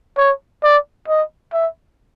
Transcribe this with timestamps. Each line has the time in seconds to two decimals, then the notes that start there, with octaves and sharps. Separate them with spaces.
0.17 C#5
0.63 D5
1.08 D#5
1.53 E5